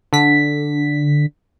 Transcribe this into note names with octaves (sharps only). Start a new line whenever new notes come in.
D3 B6